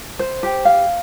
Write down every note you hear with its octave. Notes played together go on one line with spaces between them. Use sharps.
C5
G4
F5